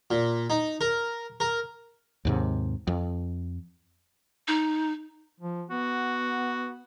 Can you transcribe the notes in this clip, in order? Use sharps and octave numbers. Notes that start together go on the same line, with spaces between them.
A#2
D#4
A#4
A#4
D#2 G#2 C3
F2
D#4
F3
B3 F#4